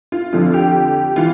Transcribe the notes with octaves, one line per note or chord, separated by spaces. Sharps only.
F4
F2 D3 F3 F4
G4
E3 F4